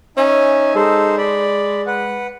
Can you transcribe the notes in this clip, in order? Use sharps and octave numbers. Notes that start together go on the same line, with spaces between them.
C#4 D#4 E5 G#5
G#3 D#4 A4 C5
D5 B5
B4 F#5